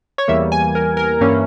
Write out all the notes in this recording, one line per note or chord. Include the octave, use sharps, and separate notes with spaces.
C#5
E2 E3 G3 A#3 E5
G#5
A#4
A#4
G2 E3 A#3 C#4